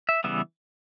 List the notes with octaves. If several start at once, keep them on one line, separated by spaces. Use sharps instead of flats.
E5
C#3 E3 G3 B3 E5